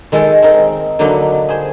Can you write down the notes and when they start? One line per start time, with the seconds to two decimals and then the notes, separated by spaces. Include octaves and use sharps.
0.12 D#3 G#3 G#4 A4 G5
0.42 C4 D#4 A#4
0.99 D3 F#3 A#3 D#4 B4 C6
1.49 G#4 C5